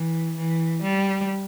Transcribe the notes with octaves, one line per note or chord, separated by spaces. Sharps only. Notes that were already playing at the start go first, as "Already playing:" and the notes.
Already playing: E3
E3
G3